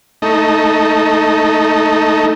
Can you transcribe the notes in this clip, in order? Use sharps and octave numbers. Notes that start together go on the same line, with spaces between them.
A3 D#4